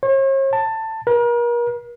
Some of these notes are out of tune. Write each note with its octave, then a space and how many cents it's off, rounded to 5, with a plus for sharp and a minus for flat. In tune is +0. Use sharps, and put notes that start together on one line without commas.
C#5 -45
A5 +15
A#4 +40